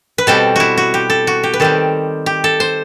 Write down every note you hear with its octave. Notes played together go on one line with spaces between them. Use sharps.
B4
B2 G3 C4 A4
E4 F#4
F#4
G4
A4
F#4
G4
B4
D#3 G3 C4 A4
G4
A4
C5